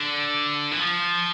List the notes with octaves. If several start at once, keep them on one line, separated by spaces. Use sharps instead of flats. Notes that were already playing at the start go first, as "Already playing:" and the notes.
Already playing: D3
E3
F3